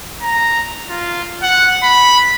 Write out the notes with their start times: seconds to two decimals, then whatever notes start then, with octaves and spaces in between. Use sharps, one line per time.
0.22 A#5
0.90 F4
1.43 F#5
1.83 B5